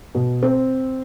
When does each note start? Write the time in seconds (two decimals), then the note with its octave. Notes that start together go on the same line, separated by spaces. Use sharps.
0.15 B2
0.43 C4